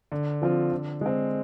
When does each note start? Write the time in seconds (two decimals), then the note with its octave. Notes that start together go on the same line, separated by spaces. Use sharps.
0.12 D3
0.42 F3 C4 F4
0.72 D3
1.01 G#3 C4